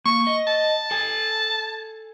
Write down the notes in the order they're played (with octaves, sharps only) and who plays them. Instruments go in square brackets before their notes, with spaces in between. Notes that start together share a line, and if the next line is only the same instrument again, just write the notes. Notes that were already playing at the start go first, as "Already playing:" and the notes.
[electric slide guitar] A#3 [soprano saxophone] C#6
[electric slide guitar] D#5
[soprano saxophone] A5
[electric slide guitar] A4 G#5